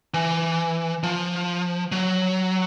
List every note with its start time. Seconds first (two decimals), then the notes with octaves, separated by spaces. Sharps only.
0.14 E3
1.03 F3
1.92 F#3